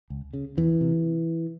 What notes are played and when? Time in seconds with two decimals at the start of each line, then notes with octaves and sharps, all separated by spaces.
0.10 C#2
0.33 C#3
0.57 E2 E3
0.81 C3